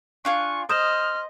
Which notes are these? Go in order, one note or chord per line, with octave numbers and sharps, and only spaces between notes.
D4 F4 G#5 C#6
C5 D#5 D#6 F6 G6 E7